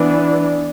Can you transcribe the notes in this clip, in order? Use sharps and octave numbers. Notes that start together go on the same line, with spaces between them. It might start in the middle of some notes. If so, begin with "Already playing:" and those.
Already playing: E3 B3 D4